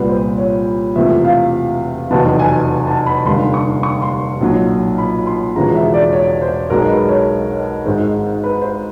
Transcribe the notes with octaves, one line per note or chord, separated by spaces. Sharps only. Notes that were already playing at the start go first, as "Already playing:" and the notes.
Already playing: C2 A#2 G3 B3 B4
C5
C#5
E1 E2 C3 F3 A3 E5
F5
F1 E2 B2 F#3 A5
G#5
A5
B5
F1 D#2 D3 G3 C6
C#6
C#6
C6
B1 A#2 F#3
B5
C6
E1 E2 C#3 F3 G#3 A#5
E5
D5
C#5
C5
B1 B2 G#3 A#4
B4
C#5
G#1 G#2 D#3 G#3 C5
B4
C5